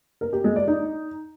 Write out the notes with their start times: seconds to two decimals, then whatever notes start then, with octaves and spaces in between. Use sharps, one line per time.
0.21 A#4
0.33 G4
0.44 G#3
0.56 D5
0.68 D#4